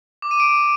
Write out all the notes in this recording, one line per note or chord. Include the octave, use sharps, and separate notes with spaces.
D6
D#7
D7